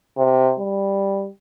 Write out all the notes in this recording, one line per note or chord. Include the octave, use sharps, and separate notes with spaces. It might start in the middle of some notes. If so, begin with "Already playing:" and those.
C3
G3